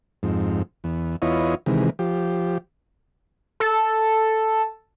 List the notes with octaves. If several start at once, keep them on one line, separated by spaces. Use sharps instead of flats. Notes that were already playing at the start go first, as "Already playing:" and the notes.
F2 G#2
E2
E2 B3 E4 F4 C#5 D#5
C3 D#3 E3 G#3
F3 G4
A4